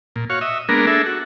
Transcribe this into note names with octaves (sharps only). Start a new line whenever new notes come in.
A#2
F#4 C#5 F5
D#5 E5
G#3 A#3 B3 D4 A#4
D4 G#4 A4 E5
F#4